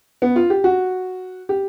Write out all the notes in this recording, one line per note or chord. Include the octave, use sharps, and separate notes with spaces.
B3
F4
G4
F#4
G4